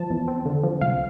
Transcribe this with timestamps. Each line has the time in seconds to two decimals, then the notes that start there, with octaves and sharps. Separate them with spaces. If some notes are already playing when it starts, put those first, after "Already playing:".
Already playing: F3 A5
0.10 E2
0.28 C4
0.46 D3
0.64 F3
0.81 C2 F5